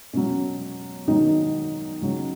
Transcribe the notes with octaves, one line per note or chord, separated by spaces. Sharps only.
B2 F#3 C#4
B2 D#3 F#3 D#4
C#3 F#3